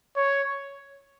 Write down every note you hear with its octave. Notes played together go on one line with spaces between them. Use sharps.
C#5